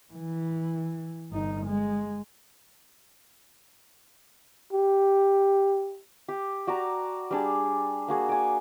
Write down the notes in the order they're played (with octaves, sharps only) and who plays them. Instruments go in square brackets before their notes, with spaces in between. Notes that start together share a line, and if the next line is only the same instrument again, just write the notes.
[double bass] E3
G1 D#4
G#3
[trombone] G4
[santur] G4
F#4 D5 A5 A#5
G3 D4 G#4
A#3 F#4 G#4
D5 G#5